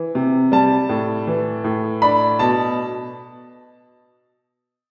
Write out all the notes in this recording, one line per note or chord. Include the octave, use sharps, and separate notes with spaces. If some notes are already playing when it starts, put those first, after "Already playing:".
Already playing: E3
C3
G3 A5
A2
E3
A2
D4 B5
B2 A5